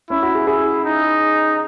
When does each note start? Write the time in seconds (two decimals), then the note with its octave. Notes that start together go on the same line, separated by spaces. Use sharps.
0.10 C#4 E4
0.22 F#4
0.35 G#4
0.47 E4 G#4
0.85 D#4